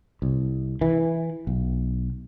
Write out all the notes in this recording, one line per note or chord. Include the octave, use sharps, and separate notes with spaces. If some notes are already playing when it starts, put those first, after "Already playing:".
C2
E3
B1